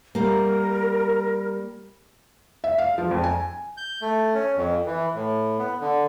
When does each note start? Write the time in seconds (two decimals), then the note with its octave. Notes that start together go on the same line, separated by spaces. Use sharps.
0.15 G3 A#3 A#4
2.64 E5
2.78 F5
2.98 F3
3.11 F2
3.24 G#5
3.77 G6
4.02 A3
4.34 C#4
4.56 F2
4.87 E3
5.15 A2
5.58 B3
5.81 D3